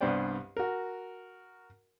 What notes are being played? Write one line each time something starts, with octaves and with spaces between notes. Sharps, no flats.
C2 G2 B3 C5 D5 G5
F#4 A#4